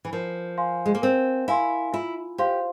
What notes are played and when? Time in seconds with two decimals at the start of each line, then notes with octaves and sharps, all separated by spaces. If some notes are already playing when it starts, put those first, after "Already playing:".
0.05 E3
0.13 F3 A#4
0.58 F5 G#5 C6
0.86 G#3
0.95 A#3
1.02 C4 A#4
1.48 E4 F5 G#5 C6
1.93 E4 F4
2.38 G4 C5 F5 C6